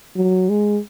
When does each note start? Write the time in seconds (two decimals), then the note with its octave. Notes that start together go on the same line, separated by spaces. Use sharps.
0.16 F#3
0.49 G#3